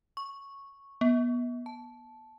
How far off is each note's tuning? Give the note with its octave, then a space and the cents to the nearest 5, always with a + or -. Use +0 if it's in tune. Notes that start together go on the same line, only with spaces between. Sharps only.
C#6 -5
B3 -25
A5 -10